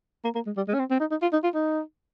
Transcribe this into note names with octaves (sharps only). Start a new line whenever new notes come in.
A#3
A#3
G#3
G3
G#3
C#4
C4
C4
D#4
D#4
F4
D#4
F4
D#4